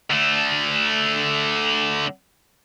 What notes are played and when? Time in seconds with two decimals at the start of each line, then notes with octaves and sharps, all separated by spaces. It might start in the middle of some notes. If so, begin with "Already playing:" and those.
0.11 D3 A3